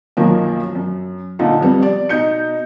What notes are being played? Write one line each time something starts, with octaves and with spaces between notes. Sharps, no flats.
B1 F#2 B2 D#3 F3 A#3
F#2
A#2 D3 D#4 F4
F2 C3 G3 B3
D5
B2 D#4 G6 C#7